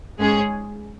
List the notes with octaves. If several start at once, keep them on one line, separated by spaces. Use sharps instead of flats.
G#2 G#3 C#4 G#4